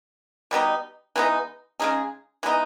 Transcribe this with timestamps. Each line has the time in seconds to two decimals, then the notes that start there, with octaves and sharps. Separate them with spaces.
0.51 B2 G3 B3 D#4
1.16 E3 G#3 B3 D#4
1.80 C#3 G#3 D#4 G#4
2.43 E3 G#3 B3 D#4